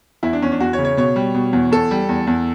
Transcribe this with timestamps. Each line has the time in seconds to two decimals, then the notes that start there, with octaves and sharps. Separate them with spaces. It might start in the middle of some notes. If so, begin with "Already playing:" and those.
0.23 E2 E4
0.33 D4
0.42 E2 C#4
0.52 D4
0.60 E2 F#4
0.73 C#5
0.79 C#3
0.85 C#5
0.97 B2 C#5
1.16 G3
1.34 B2
1.53 E2
1.72 E2 A4
1.91 G3
2.09 E2
2.27 E2